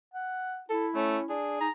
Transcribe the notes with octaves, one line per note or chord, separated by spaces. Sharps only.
F#5
E4 A4
A3 C#4
D4 G#4
D#4 A#5